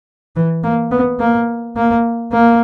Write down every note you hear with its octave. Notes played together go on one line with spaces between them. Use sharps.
E3
A#3
B3
A#3
A#3
A#3